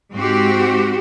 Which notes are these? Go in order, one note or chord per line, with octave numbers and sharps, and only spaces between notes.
G#2 C4 F#4 G4